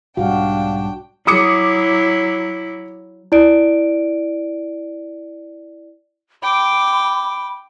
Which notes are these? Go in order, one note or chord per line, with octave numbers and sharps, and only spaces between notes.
B1 G#2 G3 D4 F#4 F5 G5
F#3 E4 D6 D#6 C#7
E4 D5 D7
G5 B5 D6